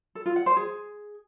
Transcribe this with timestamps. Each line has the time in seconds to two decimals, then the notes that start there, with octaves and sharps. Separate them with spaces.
0.15 A4
0.26 F4
0.36 F#5
0.46 C5
0.57 G#4